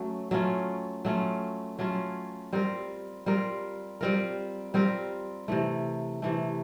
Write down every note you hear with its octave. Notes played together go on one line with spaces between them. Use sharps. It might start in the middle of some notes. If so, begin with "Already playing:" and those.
Already playing: F#3 A3 C#4
F#3 A3 C#4 F4
F#3 A3 C#4 F4
F#3 A3 C#4 F4
G3 C4 F4 A#4
G3 C4 F4 A#4
G3 C4 F4 A#4
G3 C4 F4 A#4
C3 E3 A3
C3 E3 A3